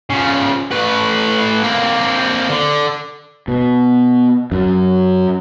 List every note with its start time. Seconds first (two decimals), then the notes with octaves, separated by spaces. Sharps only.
0.10 C#3 F3
0.72 A3 B4
1.63 A#3 C4
2.49 D3
3.48 B2
4.52 F#2